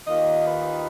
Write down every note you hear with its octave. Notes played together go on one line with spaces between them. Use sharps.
D#2 D#3 A#3 F4 D#5
B4